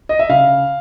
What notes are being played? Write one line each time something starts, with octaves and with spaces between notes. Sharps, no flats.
D#5
E5
C#3 F5